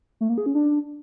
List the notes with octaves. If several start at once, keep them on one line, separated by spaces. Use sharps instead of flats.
A3
A#3
G#4
C#4
D4